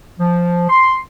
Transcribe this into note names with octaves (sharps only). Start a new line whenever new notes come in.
F3
C6